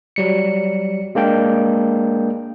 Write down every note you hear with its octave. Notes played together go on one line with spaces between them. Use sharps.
F#3 G3 C#7
G#3 A#3 D4 G5